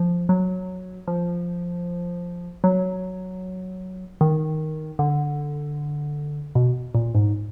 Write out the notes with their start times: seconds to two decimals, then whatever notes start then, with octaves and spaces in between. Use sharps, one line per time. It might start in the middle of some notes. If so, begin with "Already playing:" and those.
Already playing: F3
0.29 F#3
1.08 F3
2.64 F#3
4.21 D#3
4.99 D3
6.55 B2
6.95 A#2
7.15 G#2